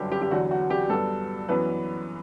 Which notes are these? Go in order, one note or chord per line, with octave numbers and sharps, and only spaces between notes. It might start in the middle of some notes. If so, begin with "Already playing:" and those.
Already playing: G1 F#2 D3 G3 G4
G4
G4
E2 D3 F#3 F#4
F#4
G4
G2 F#3 B3 A4
F#2 E3 B3 B4